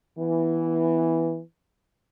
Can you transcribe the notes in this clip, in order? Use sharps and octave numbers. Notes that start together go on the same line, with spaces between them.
E3 B3